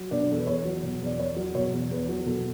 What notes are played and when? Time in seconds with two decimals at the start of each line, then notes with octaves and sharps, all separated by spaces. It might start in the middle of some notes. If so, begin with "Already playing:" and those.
Already playing: F#3
0.11 B2 D4
0.30 E2 A4
0.39 B4
0.47 E2 C#5
0.65 F#3
0.83 B2
1.02 E2 D5
1.20 E2 C#5
1.36 F#3
1.55 B2 C#5
1.72 E2
1.91 E2 B4
2.09 F#3
2.26 B2 A4